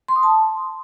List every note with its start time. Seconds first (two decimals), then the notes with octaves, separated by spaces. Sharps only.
0.08 C6
0.16 D#6
0.23 A5